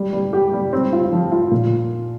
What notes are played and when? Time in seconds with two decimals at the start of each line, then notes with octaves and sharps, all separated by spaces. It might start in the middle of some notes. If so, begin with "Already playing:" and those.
Already playing: G3
0.13 G3
0.33 G4
0.53 G3
0.73 C4
0.92 F4
1.12 F3
1.32 F4
1.51 A#2